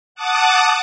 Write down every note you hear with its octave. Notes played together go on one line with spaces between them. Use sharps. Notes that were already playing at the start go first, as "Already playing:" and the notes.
F#5 A5 D6 D#6